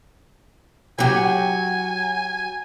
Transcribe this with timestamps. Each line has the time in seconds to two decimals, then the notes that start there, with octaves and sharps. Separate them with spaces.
0.99 F#3 G4 G#5